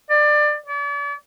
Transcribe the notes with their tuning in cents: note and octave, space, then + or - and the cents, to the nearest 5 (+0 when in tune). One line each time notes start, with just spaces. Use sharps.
D5 +25
D5 -40